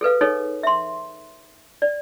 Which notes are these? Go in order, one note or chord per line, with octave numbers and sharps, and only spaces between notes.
G#4 A4 B4 F5
D#4 G#4 A4 C#5
E5 C6
D5